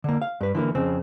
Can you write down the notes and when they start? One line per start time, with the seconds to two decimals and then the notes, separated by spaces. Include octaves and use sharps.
0.04 D3 A#3
0.22 F5
0.41 G2 B4
0.55 D3 E3 A3 A#3
0.75 F2 C#3 C4